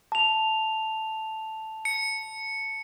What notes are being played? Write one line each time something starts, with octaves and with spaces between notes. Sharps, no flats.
A5 F7
C#7